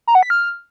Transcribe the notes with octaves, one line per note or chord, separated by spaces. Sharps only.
A#5
F#5
B6
F6